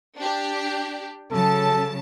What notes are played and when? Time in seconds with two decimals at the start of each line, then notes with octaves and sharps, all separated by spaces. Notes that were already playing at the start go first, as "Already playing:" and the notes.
0.17 D4 G4
1.31 C#3 F#3 A4 A5